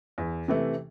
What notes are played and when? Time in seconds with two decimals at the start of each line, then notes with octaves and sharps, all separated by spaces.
0.18 E2
0.48 C3 E3 A3